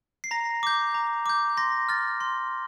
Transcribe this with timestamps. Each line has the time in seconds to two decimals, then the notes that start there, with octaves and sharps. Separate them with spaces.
0.24 C7
0.31 A#5 A#6
0.63 D6 G6
0.94 A#5
1.26 D6 G6
1.57 C6 A#6
1.89 F6 A6
2.21 C6